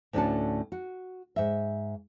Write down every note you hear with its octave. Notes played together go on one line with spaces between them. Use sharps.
D2 A2 C#4 D4 F#4 A5
F#4
G#2 E5